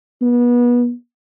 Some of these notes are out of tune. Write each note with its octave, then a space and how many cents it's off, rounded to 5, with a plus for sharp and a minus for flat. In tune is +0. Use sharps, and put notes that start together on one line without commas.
B3 -30